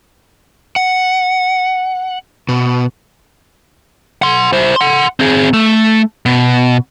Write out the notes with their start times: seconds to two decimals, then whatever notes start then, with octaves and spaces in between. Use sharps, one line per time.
0.76 F#5
2.49 B2
4.22 F#5 C6
4.53 E4 C5
4.76 F#5 C6
5.20 C4 G#4
5.53 A3
6.26 B2